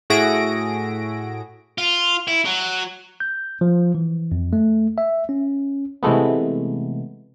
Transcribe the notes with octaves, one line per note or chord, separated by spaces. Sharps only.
A2 F#4 G#4 E5 A#6 D7
F4
E4
F#3
G6
F3
E3
F2
A3
E5
C#4
C3 E3 G#3 A3 B3